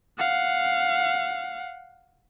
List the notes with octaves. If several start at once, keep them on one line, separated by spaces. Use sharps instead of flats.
F5 F#5